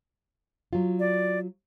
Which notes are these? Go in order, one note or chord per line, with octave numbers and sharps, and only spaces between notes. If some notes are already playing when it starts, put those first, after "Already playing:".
F#3 F4
D5